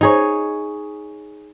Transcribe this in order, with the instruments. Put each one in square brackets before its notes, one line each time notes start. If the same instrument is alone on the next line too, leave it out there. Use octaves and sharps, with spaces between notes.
[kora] D#4 G#4 C#5